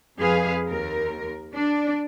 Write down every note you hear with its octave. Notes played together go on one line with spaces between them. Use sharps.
F2 G#4 B4 F5
D#2 A#4
D4 D5